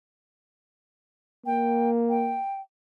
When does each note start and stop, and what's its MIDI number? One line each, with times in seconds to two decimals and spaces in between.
1.46 2.40 58
1.46 1.91 79
2.09 2.60 79